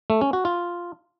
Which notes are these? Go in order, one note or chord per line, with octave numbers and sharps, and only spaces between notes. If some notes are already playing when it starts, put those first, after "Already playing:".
A3
C#4
F#4
F4